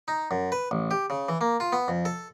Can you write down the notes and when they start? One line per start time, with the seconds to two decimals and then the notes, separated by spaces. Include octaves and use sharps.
0.08 D#4
0.31 F#2
0.52 B4
0.71 A1
0.91 G4
1.10 C#3
1.29 E3
1.41 A#3
1.60 F4
1.72 B3
1.88 F2
2.05 A4